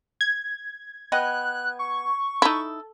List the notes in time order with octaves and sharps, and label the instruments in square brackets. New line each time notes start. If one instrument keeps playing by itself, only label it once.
[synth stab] G#6
[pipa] B3 D#5 G5 [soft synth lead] F#6
[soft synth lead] C#6
[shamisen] D#4 E4 [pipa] A4